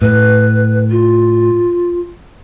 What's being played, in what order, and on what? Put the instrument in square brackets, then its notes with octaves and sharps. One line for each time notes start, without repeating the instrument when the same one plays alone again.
[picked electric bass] A2 [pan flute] B4
[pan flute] F4